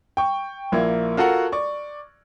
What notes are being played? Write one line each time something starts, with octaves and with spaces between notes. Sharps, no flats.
G5 C#6
A#1 A#3 E4 G#6
F4 F#4 A4 A#4 F#5
D5 C#6